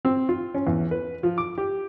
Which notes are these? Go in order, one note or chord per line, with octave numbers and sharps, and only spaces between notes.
C4
F4
C#4
E2
B4
F3
D6
G4